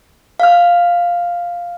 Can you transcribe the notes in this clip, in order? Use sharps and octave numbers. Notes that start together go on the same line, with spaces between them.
F5 F6